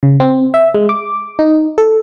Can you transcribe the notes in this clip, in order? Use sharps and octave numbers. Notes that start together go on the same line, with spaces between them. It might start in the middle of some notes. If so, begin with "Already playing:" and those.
C#3
C4
E5
G#3
D6
D#4
A4